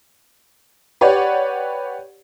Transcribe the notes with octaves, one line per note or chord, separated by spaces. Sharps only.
G4 B4 C#5 D5 F#5